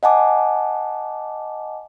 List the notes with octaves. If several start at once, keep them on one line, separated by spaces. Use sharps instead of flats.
D#5 F#5 G#5 A5 D6